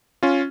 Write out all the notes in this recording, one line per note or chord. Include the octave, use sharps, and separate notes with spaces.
C#4 F4